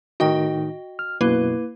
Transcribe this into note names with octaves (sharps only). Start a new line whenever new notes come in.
A2 D#3 D#4 F#4 D#5 G5
F6
F#2 B2 A#3 E4 B4